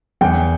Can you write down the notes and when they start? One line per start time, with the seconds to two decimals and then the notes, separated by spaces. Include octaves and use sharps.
0.21 E2 G5